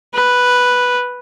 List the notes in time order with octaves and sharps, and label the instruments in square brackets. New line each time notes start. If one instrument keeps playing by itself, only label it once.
[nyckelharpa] B4